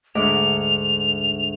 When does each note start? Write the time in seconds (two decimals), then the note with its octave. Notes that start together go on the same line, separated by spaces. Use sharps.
0.15 D2 G#2 D6 F7